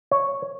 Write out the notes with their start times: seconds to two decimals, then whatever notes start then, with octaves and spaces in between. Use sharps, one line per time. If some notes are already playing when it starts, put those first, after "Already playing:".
0.11 C#5